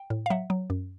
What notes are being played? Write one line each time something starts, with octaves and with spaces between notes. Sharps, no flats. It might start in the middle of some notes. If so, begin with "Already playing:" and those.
Already playing: G5
A2
F5
F#3 E5 F#5
F#3
F#2